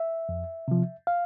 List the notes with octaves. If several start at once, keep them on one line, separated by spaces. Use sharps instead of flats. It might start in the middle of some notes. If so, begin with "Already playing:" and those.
Already playing: E5
F2
C3 F3
F5